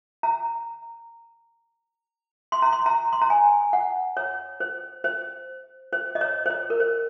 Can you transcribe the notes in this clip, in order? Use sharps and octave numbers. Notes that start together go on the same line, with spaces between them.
A#5
C6
A#5
C6
A#5
C6
A#5
G#5
F#5
C#5
C5
C5
C5
D#5
C#5
C5
C#5
A#4
C5